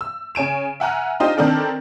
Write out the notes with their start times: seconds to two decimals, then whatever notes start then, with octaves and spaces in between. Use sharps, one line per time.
0.01 E6
0.35 C#3 C#5 G#5 D7 E7
0.80 E5 F#5 G#5 A#5 F6
1.20 D4 D#4 F4 G4 C5 D#5
1.37 D#3 C4 D4 A4 A#4